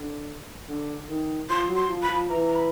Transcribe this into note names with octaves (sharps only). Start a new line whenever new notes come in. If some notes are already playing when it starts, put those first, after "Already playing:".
Already playing: D3
D3
D#3
F3 C6
F#3
C6
F3
B5
F3
E3 A#5
A#5
B5